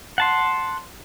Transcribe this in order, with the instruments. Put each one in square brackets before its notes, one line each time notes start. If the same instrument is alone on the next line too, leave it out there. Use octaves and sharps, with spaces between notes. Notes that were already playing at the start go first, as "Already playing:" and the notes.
[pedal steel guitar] F#5 A5 C6